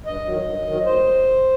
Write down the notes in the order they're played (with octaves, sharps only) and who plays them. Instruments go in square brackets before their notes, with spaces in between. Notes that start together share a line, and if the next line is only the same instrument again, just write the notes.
[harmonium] G2 D#5
D#3 F#3
G2
D#3 F#3
D2 C5